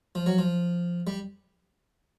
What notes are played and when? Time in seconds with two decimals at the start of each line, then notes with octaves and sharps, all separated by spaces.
0.15 F3
0.26 F#3
0.38 F3
1.07 G3